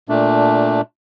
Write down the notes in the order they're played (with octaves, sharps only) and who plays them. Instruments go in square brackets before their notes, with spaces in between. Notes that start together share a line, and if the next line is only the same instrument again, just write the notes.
[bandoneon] A#2 A3 D4